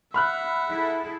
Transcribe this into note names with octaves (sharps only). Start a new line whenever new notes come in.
E5 F#5 B5 F6 F#6
E4 G#4 A4